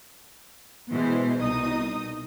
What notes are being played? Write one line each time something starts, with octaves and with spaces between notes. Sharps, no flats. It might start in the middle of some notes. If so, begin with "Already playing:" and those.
B2 E3 G#3 C5
C2 B2 D#4 D#5 D#6